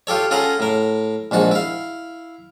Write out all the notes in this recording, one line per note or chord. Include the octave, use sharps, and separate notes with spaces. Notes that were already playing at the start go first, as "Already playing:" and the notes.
F4 G4 A4 C#5
C#4 F4 G#4 A4 F#5 A#5
A2 A#4
A#1 G#2 F#4 A5
E4 F5